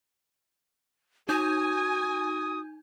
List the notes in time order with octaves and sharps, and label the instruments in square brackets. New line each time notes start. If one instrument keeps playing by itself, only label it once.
[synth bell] D#4 G6 [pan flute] F#4 [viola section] G#5 [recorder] D#6